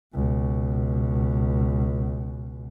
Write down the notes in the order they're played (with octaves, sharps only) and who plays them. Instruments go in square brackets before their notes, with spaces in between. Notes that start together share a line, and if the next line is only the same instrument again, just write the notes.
[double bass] C#2 B2